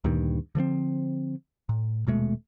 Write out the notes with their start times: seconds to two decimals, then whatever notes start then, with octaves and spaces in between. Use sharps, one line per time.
0.04 D2 G2 A#2 D#3
0.55 D3 F3 A3 C4
1.69 A2
2.07 D#1 B2 G#3 A3